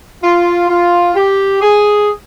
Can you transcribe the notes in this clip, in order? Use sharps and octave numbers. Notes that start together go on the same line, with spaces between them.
F4
F4
G4
G#4